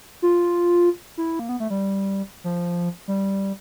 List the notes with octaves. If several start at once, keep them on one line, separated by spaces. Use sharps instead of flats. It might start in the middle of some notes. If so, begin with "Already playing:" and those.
F4
E4
A#3
B3
A3
G3
F3
G3